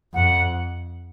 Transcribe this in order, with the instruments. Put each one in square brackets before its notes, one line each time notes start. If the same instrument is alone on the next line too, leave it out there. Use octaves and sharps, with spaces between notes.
[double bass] F2 [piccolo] F#5